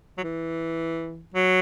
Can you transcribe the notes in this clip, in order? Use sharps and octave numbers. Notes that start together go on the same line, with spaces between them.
F#3
E3
F#3